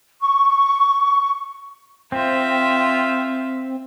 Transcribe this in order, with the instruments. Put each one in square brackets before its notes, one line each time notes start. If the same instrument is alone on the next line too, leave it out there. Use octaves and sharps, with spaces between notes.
[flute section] C#6
[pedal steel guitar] C4 [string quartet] F4 E5